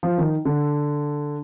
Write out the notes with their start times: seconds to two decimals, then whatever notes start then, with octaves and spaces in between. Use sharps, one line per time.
0.03 F3
0.18 D#3
0.45 D3